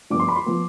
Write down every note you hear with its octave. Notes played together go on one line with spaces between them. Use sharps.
G2 F3 B3 D6
C6
B5
C6
F3 B3